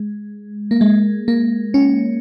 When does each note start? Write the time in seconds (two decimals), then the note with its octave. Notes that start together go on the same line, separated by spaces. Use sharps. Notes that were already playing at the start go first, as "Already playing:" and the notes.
Already playing: G#3
0.71 A#3
0.81 G#3
1.28 A#3
1.74 C#4